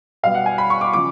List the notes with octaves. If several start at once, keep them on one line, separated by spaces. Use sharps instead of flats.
B2 G3 B3 F5
F#5
G#5
B5
C#6
D6
C#3 F3 D6